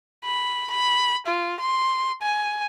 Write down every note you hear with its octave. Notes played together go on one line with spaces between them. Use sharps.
B5
B5
F4
C6
G#5